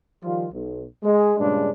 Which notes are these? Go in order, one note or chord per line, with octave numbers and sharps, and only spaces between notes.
D#3 F3 G3 F4
B1
G#3
G2 A#2 C#3 G#3 D4